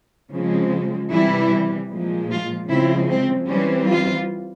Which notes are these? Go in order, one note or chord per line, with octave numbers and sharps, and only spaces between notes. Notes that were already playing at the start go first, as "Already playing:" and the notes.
C#3 F3 G#3 C4
C3 E3 G3 E4
A#2 F3 G#3
F4
C#3 F3 G#3 C4 E4
C4
E3 G3 C4 C#4
F4